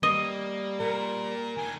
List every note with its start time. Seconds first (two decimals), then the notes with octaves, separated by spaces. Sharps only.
0.03 G3 A#3 D#5
0.80 A#2 A#4
1.57 D#3 D4 G#5